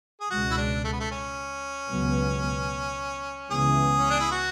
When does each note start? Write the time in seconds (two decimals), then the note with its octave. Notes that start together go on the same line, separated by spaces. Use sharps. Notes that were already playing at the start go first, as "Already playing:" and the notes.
0.21 G#4
0.30 C#2 B2 G#3 F#4
0.51 E4
0.57 D4
0.84 A3
0.93 B3
1.00 A3
1.11 C#4
1.90 C#2 B2 F#3 B3
3.51 C#2 C#3 E3 B3 G#4
3.99 C#4
4.10 D4
4.20 E4
4.31 F#4